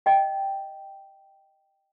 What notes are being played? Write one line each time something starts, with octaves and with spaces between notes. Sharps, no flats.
D#5 G5